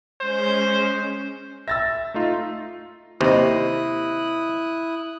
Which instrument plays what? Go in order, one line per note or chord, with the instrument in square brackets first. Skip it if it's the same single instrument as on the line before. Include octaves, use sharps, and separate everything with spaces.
[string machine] G#3 C#4 [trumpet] C5
[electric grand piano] E5 [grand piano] E6 A6 A#6
[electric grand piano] A3 D#4 F4
[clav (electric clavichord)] D#2 C3 [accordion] E4 D#6 F#6 [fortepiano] C5 D#5